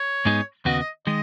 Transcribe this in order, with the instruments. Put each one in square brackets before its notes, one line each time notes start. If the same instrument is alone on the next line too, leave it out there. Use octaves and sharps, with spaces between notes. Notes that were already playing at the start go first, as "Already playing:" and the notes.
Already playing: [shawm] C#5
[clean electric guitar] G#2 G#3 B3 D#4 G#4
[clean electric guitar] D#2 C#3 B3 F#4 [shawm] D#5
[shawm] D#5
[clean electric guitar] D#3 G#3 [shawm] D#5